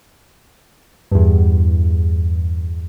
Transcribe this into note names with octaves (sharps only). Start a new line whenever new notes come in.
E2 G2